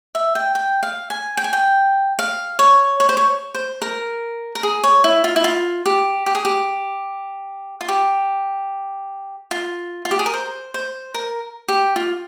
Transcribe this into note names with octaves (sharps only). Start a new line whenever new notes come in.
E5
G5
G5
F5
G#5
G5
G#5
G5
F5
C#5
C#5
C5
C#5
C5
A#4
A#4
G#4
C#5
E4
F4
E4
F4
G4
G4
G#4
G4
F4
G4
F4
F4
G4
G#4
A#4
C5
C5
A#4
G4
F4